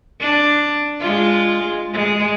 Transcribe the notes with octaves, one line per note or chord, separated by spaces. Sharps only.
D4
G#3 F4
G#3